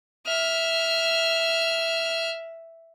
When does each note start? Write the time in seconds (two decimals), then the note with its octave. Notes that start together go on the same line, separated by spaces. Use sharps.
0.26 E5 F6